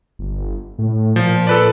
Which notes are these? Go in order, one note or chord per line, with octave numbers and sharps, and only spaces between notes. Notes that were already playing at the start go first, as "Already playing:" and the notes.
G1
A2
A#2 F3
A4 B4 D5